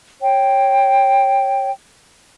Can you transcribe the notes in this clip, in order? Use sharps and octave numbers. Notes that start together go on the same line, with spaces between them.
C#5 G5